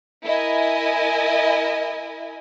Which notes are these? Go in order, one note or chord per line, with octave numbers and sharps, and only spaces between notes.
E4 A#4 D#5 G#5